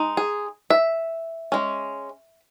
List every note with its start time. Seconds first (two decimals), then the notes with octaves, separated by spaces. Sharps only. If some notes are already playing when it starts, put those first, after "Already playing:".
Already playing: G#3 D#4
0.17 G#4
0.70 E5
1.52 G#3 C#4